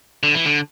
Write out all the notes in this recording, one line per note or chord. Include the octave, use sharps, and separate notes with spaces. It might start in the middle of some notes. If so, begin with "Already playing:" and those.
D3
E3
D3